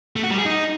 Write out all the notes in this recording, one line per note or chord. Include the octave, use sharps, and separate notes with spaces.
A3
F#4
G3
G#4
D#4